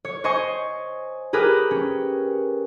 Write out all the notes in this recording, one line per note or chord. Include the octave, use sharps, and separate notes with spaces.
C#5
C5 D#5 G#5 C#6
G4 G#4 A#4 B4
C#4